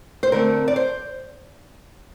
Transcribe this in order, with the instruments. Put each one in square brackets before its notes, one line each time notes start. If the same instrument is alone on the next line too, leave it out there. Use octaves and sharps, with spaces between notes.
[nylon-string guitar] C5
D3 A3 C4 A#4
D5
C5